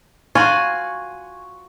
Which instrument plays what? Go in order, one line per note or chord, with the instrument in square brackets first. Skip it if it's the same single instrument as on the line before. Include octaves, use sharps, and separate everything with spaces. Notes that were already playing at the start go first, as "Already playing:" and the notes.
[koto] F4 F#4 F5 [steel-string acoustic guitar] G#5 [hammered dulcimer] C#6